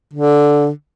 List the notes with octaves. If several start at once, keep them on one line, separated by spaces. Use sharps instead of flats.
D3